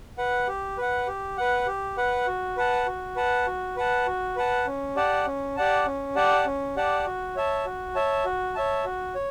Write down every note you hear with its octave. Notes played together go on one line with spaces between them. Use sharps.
B4 F#5
G4
B4 F#5
G4
B4 F#5
G4
B4 F#5
F#4
B4 F#5 A5
F#4
B4 F#5 A5
F#4
B4 F#5 A5
F#4
B4 F#5 A5
C#4
G4 D5 F#5 A5
C#4
G4 D5 F#5 A5
C#4
G4 D5 F#5 A5
C#4
G4 D5 F#5 A5
F#4
C#5 E5 A5
F#4
C#5 E5 A5
F#4
C#5 E5 A5
F#4
C#5